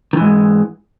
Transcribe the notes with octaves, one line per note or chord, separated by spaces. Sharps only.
G#2 D#3 E3 G#3